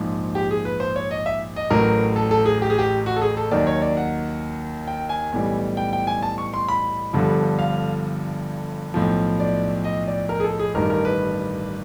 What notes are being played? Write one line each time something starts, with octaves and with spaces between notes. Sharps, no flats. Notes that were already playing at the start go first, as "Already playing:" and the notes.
Already playing: A#1 G#2 F3
G4
G#4
B4
C5
C#5
D#5
E5
D#5
A1 A2 F#3 A#4
A4
A4
G#4
G4
G#4
G4
F#4
A4
G#4
A4
D#2 D#3 F#3 D5
C#5
D5
F#5
G5
G#5
B1 A2 E3 G3
G5
G5
G#5
A5
C#6
C6
B5
G1 G2 D3 F3
F5
B1 A2 F3
D5
D#5
D5
A#4
G#4
A4
G#4
A1 G2 D#3 A#4
A#4
B4